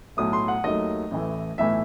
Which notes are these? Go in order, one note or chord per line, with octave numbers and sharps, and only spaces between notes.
B1 A2 F#3 A3 D#6
C6
F#5
D#2 D#3 F#3 A3 D#5
A1 A2 E3 A3
B1 A2 E3 A3 E5